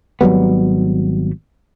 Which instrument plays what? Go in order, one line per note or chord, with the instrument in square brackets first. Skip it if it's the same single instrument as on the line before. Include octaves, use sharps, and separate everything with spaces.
[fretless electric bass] G#1 F#3 G3 B3